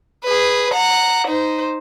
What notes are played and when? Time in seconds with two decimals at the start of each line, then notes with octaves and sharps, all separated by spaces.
0.24 G#4 B4
0.74 F#5 A#5
1.28 D#4 C5